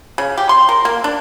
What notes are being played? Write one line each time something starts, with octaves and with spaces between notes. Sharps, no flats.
C#3
G4
C6
A#4
A#3
D4